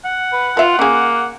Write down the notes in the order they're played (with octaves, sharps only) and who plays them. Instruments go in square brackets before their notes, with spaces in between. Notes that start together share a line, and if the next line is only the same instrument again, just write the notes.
[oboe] F#5
[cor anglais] B4
[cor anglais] F4 [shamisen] B4 E5
[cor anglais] A#3 [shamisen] C#4 G#4